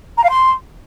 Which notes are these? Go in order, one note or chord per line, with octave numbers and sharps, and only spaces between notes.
A#5
F5
C6